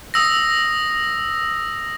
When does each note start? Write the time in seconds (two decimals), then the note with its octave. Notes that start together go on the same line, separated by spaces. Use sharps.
0.14 D#6 E6 A#6